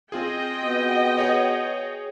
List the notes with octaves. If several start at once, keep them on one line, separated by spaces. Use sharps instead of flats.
C4 F4 G#4 D#5 G5
B3 F#4
G#4 C#5